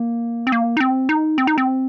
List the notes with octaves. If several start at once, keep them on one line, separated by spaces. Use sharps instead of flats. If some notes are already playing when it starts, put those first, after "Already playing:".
Already playing: A#3
C4
A#3
D#4
C4
D#4
C4
D#4
C4